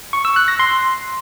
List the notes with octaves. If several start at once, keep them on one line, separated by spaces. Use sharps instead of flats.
C#6
E6
F#6
A#6
C6